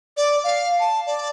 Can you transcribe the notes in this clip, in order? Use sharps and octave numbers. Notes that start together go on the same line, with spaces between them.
D5
F5
A5
D5